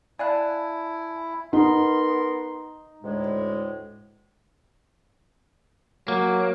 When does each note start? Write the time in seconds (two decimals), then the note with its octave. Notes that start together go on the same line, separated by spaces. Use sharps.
0.19 E4 D5 F5 G#5 A5 F#6
1.53 B3 D#4 A#4 C6
3.03 D2 A2 G#3
6.08 F#3 A#3